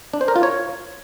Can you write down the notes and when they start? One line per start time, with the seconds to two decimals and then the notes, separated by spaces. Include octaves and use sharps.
0.13 D4
0.21 C5
0.28 A#4
0.36 F4
0.43 C#5